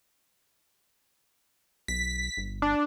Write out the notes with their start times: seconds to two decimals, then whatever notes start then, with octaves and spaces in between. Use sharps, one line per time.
1.88 B1 B6
2.37 G1
2.62 D4